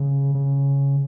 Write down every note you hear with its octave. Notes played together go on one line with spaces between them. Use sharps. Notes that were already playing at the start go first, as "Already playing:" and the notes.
Already playing: C#3
C#3